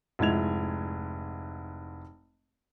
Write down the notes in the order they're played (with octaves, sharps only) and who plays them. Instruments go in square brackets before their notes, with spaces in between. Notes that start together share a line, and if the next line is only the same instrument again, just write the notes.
[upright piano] F1 G#2 G#3 E4 G#6 F7